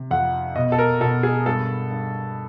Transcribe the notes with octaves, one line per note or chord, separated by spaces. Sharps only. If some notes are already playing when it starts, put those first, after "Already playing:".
Already playing: C3
F2 F#5
B2 D#5
A4
A#4
B2 A4
G#4
G2 A4
G2